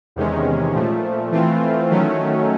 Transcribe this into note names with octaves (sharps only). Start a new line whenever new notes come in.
E2 C3 D#3 G#3 C#4
A#2 F3 A3
E3 A3 C4 F4
D#3 F#3 A3 C#4